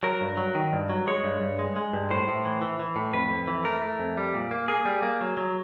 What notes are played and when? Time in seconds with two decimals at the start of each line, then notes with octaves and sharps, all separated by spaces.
0.03 F#3 A#4
0.21 G2
0.37 F#3
0.55 D#3
0.73 G2
0.90 F#3
1.07 G#3 C#5
1.24 G2
1.41 G2
1.59 G#3
1.76 G#3
1.93 G2
2.11 A2 C5
2.28 A2
2.45 E3
2.62 E3
2.80 E3
2.96 A2
3.13 F2 B4
3.30 F2
3.48 E3
3.65 A3 A#4
3.82 A3
3.99 F2
4.17 G3
4.34 A#2
4.51 A#3
4.68 A#3 G#4
4.85 G3
5.03 A#3
5.21 F#3
5.37 F#3